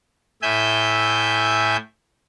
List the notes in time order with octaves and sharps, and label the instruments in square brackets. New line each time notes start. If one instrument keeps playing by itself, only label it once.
[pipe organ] A2 E5 G#5 G6